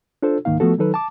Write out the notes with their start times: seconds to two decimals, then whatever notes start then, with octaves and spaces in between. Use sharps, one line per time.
0.23 D4 F4 A4 C5
0.45 C#2 G#2 D#3 A#3 D#4 F5
0.60 F3 A3 B3 F#4 A4
0.78 D#3 F#3 D#4 A4 B4
0.94 A5 D6